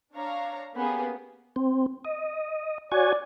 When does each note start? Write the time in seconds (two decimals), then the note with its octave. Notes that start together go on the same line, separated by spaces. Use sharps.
0.15 D4 C#5 F5 A#5
0.75 A#3 B3 C#4 G4 G#4
1.56 C4
2.05 D#5
2.92 F#4 C#5 D5 G#5